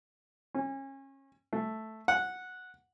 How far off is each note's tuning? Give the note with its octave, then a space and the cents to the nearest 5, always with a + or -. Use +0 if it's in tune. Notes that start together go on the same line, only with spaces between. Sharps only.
C#4 -30
A3 +0
F#5 -10